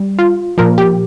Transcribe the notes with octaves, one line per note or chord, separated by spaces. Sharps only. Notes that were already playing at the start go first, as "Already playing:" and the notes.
Already playing: G3
F4
A#2 F3 A#4
G4